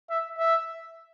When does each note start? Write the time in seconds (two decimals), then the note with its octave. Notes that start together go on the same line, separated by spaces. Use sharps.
0.10 E5
0.39 E5